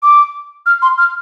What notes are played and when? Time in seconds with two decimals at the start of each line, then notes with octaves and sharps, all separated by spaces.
0.03 D6
0.66 F6
0.82 C6
0.98 F6